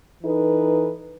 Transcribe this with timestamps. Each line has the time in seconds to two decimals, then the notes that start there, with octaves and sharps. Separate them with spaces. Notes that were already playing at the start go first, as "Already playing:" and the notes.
0.23 E3 D#4 A4 B4